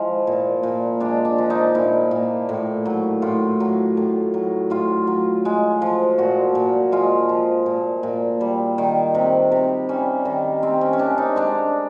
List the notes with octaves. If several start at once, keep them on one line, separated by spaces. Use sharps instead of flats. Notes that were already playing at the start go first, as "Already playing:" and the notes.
Already playing: F3 G#3 E4
A#2
A#2
G#3 D4
D4
F3
D#4
A#2 E4
A#2
A2
F#3
A2 F4
F#3
A2
F#3
A2 F4
F#3
G#3
F3
A#2 F#4
A#2
G#3 F4
F3
A#2
A#2
G3
D#3
C3
C3
G3 C#4
D#3
C3 C4
C#4
C#4
C3 D4
D#4
G#3 D4